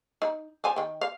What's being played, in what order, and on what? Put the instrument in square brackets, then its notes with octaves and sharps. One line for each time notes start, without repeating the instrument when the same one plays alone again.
[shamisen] D#4
F3 G#5
D#3 G5
F5